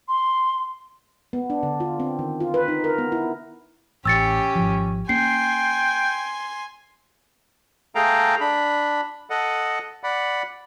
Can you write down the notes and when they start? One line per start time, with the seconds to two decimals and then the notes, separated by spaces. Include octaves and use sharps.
0.08 C6
1.33 B3
1.50 D4
1.63 D3
1.80 F4
2.00 C4
2.19 D#3
2.40 F4
2.54 B4
2.68 D#4
2.84 A#4
2.98 B3
3.12 E4
4.05 A1 C#4 G4 E6 A6 C#7
4.55 G#1 F3
5.09 A#3 C#4 G5 G#5 C6 C7
7.95 A3 G#4 A4 F5 G5 A#5
8.40 D4 B5
9.30 A4 D#5 F#5
10.03 D5 F#5 B5